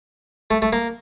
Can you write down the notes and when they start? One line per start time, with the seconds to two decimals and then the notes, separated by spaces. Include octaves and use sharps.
0.51 A3
0.62 A3
0.73 A#3